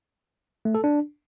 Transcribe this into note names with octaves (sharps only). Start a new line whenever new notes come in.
A3
A4
D4